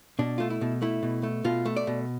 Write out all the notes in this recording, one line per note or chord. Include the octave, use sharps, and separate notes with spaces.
B2 D4
A3 F4
E4
B2
A3 E4
B2
A3
B2 F4
A3
D5
B2